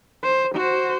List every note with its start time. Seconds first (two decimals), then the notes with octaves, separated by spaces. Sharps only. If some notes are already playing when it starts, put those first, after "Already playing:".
0.23 C5
0.56 F#4 C5